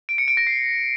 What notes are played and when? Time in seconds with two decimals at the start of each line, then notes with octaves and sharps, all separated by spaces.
0.09 D7
0.18 C#7
0.28 D7
0.37 A#6
0.47 C7